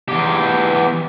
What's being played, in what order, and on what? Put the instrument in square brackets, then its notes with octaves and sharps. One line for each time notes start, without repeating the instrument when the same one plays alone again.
[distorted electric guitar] E2 G4